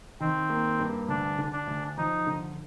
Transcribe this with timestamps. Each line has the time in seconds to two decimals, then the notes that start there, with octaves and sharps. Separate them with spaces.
0.20 D#3 C4
0.50 A#3
0.79 G2
1.08 D2 D4
1.38 D3
1.52 D4
1.67 D2
1.98 F3 D#4
2.27 D3